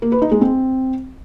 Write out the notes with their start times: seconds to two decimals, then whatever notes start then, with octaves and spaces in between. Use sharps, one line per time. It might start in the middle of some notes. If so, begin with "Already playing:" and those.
0.02 A#3
0.12 B4
0.22 D#4
0.32 G#3
0.41 C4